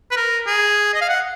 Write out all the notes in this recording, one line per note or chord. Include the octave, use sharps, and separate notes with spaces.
B4
A#4
G#4
D#5
F5
F#5